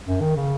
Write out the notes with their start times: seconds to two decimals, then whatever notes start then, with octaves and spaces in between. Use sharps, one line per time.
0.07 F#2
0.21 D#3
0.37 C#3